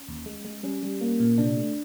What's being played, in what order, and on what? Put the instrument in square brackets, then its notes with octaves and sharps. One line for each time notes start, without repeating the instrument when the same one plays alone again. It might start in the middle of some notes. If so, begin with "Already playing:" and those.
Already playing: [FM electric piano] C#4
D#2
G#3
G#3
G3 C#4
G3
A#3
A#2
C3 D4
A3